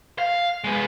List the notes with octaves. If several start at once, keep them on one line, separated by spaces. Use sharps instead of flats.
F5
G#3 B3